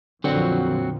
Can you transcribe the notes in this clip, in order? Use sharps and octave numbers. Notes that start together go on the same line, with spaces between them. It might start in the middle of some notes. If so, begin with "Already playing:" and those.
F2 A#2 D3 F3 F#3 C4 F#4